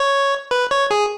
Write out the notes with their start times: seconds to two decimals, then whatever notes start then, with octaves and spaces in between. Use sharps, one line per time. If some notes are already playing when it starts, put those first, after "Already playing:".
Already playing: C#5
0.51 B4
0.71 C#5
0.91 G#4